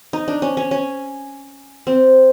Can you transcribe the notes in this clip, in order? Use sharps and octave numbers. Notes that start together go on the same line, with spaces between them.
D#4
D4
C#4
C#4
C#4
C4